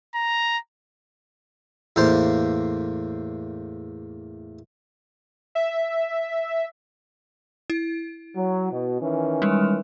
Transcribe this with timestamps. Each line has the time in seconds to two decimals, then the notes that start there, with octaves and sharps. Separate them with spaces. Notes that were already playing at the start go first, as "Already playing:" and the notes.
0.15 A#5
1.96 E2 A2 A#3 C5 F5 A5
5.55 E5
7.70 E4
8.36 F#3
8.71 B2
9.01 D#3 E3 C#4
9.42 G3 G#3